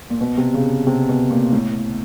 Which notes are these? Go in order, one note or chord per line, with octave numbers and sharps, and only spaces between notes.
A#2
B2
C3
C#3
C3
B2
A#2
A2